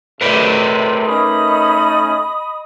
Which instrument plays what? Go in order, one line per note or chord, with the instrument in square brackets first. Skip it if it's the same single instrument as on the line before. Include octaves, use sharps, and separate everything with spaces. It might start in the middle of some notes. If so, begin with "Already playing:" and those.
[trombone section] A2 C3 A3 [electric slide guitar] A#4 B4 D5
[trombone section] A3 C#4 D#4 [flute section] D#5 B5 D#6